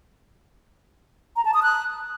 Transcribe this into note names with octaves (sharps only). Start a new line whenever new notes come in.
A#5
A5
D#6
F#6